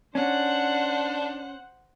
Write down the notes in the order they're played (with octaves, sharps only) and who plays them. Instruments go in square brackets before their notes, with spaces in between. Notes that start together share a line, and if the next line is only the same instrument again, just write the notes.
[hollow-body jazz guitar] C#4 [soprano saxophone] D4 [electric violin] C5 F#5